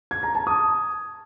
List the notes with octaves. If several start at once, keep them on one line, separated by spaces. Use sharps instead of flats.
G#6
A#5
A5
D#6